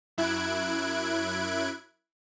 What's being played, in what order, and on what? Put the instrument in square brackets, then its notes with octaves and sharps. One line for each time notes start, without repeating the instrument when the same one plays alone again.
[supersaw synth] F#2 E4 F#6 G#6 D7